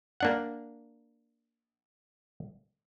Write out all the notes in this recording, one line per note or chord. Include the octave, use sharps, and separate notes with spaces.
A#3 D4 F#5